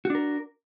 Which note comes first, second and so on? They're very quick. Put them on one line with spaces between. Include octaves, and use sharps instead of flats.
F#4 D4 A#4